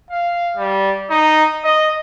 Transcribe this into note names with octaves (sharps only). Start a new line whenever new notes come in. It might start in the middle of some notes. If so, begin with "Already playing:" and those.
F5
G3
D#4
D#5